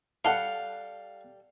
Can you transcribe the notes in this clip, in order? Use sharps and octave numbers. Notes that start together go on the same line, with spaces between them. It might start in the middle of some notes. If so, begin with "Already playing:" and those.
G3 A4 F5 F#5